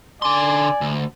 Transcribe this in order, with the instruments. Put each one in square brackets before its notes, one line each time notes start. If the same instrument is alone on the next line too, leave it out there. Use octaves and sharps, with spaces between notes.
[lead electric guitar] D3 C6 [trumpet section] D5 G#5
[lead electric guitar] D2